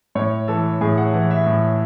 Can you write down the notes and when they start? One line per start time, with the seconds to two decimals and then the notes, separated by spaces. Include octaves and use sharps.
0.15 A2 C#5
0.48 E3 A4
0.81 A2 G#4
0.98 F#5
1.14 E3 F#5
1.31 E5
1.46 A2